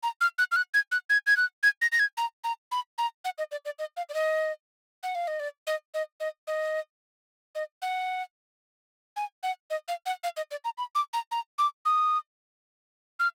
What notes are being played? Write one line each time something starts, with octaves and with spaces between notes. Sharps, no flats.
A#5
F6
F#6
F6
F#6
G#6
F#6
G#6
G#6
F#6
G#6
A#6
A#6
G#6
A#5
A#5
B5
A#5
F#5
D#5
D5
D5
D#5
F5
D5
D#5
F#5
F5
D#5
D5
D#5
D#5
D#5
D#5
D#5
F#5
G#5
F#5
D#5
F5
F#5
F5
D#5
D5
A#5
B5
D6
A#5
A#5
D6
D#6
F6